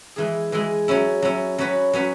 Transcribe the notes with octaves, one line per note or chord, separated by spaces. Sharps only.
E3 G#3 E4 G#4
E3 G#3 E4 G#4
F#3 C#4 E4
F#3 C#4 E4
F#3 C#4 F#4 B4
F#3 C#4 F#4 B4